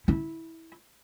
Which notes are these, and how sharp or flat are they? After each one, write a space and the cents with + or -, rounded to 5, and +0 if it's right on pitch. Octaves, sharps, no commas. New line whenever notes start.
E4 -15